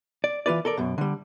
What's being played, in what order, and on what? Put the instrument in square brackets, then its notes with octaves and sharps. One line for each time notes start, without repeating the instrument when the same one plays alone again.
[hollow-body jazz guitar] D5
E3 F4 B4 D5
A4 A#4 D5
F#2 B2
D3 G3